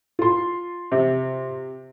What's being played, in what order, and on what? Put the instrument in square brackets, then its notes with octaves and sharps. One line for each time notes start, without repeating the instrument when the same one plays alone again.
[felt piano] F4 C6
[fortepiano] C3